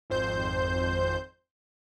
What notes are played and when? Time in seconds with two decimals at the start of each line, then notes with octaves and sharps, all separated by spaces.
0.10 G#1 F2 C5 G6